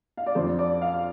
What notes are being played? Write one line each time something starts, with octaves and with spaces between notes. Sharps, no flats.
F5
D5
F2 F3 D4 C5
D5
F5